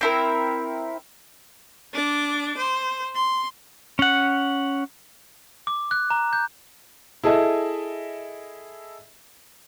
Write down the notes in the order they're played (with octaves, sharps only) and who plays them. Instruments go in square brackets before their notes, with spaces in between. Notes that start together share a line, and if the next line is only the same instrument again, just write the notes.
[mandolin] C4 E4 A#4
[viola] D4 D6
C5
C6
[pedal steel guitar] C#4 F#5
[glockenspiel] D6
F#6
A#5
G6
[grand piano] E4 G#4 A4 D#5 E5